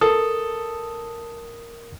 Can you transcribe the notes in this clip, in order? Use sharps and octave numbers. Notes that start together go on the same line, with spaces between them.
A4 A#4 D#6